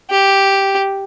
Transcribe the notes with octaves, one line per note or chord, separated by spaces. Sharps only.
G4